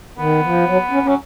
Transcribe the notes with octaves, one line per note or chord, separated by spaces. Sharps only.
D#3 B3
F3
F#3
C#4
F#3 C#4